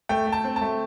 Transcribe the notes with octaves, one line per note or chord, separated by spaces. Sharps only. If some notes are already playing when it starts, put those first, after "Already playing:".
A3 G5
A3
A5
C4
A5
A3